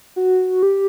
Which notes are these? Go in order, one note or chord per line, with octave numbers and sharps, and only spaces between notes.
F#4
G4